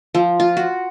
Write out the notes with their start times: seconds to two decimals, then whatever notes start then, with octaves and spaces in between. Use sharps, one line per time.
0.14 F3
0.40 F4
0.57 F#4